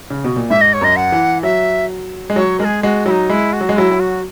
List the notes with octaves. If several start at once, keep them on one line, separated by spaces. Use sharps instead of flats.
C#3
B2
A#2
G#2 E5
D#5
C#5
F#2 D#5
F#5
E3
F#3 E5
G#3
F#3 C#5
G#3 G#4 A#4
G#3 F#4
F#3 D#4 E4
G#3 E4
F#4
F#3
G#3
F#3 E4
F#3
F#4